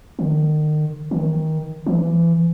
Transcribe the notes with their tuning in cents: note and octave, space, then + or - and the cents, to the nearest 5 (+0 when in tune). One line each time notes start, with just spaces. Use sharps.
D#3 -35
D#3 +20
E3 +30